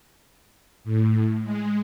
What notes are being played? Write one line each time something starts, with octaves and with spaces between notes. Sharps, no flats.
A2
G#3